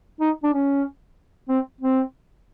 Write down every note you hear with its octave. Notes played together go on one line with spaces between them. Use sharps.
D#4
D4
C#4
C4
C4